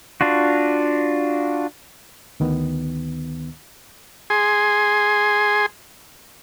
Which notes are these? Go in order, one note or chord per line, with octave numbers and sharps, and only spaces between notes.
D4 F4 F#4
D2 D#3 B3
G#4 G#5 C6